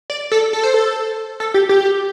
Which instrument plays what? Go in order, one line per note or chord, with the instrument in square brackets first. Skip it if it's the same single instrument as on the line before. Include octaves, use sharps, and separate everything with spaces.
[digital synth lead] D5
A4
A4
C5
A4
A4
G4
G4